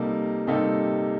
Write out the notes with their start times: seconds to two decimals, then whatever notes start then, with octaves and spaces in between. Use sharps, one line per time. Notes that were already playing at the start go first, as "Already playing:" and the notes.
Already playing: C3 G3 A#3 D#4 A4
0.47 C3 G3 A#3 D#4 A4